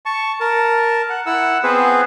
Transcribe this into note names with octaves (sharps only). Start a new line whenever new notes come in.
A5 C#6
A#4 A5
F#5
E4 F#5 E6
B3 C4 G#4 B4 C5